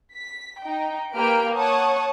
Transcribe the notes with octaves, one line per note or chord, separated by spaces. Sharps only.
B6
D#4 G5
A#3 G4 B4 G5 F6 D7
C#5 F#5 A5 C#6 D#6